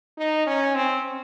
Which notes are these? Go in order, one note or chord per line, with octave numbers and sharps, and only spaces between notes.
D#4
C#4
C4